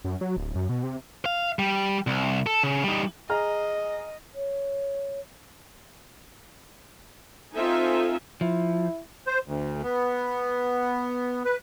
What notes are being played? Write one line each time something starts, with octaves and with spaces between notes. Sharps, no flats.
F#2
F#3
D1
F#2
B2
C3
F5
G3
C2
A4
C#3
G3 D#4
G#4 D#5 A#5 F6
C#5
C4 D#4 F4 A4 E5 G#5
F3 E4
C5
D2
B3
B4